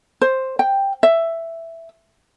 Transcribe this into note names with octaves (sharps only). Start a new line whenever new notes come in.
C5
G5
E5